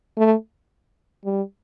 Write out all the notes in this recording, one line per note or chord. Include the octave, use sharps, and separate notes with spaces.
A3
G3